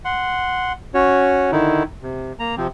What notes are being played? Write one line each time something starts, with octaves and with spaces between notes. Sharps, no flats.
F#5 C6
C#4 F#4 C#5
D3 D#3 D#4 E4
C3
A#3 A#5
C3 F3 C4